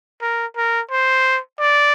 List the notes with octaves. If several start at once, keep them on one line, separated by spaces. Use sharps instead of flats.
A#4
A#4
C5
D5